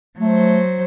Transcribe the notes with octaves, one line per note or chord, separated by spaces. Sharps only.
F#3 A3 C5